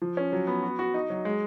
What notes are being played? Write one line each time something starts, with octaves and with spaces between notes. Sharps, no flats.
F3
C#4
F#3
B3
F#4
F#4
D#4
F#3
G#3